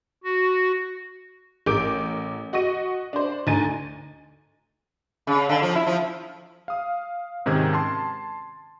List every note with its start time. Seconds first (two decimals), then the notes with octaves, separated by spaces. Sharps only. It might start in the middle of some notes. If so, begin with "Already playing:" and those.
0.24 F#4
1.66 A1 A#4 D6 G6 D7
2.53 F#4 D#5 C#6 A#6 D#7
3.13 D4 C5
3.47 D2 D#4 G#5 A#5 A6 D#7
5.27 C#3
5.49 D3
5.62 F3
5.75 E4
5.87 F3
6.68 F5 D#6
7.46 G#2 C3 D#3 C#4 G#6
7.73 A5 C6